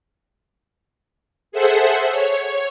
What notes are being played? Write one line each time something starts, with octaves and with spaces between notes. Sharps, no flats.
G#4 A4 C5 E5 F#5
C#5